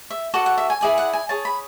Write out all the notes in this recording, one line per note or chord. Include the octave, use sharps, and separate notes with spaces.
E5
F#4 A4 D5 F#5
F#5
E5
G#5
E4 G#4 D5 G#5
F#5
G#5
G#4 C#5 A5
B5